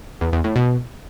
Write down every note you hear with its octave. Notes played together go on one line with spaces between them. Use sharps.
E2
E2
A2
B2